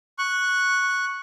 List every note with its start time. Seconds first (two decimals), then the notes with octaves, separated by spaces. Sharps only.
0.18 C#6 F#6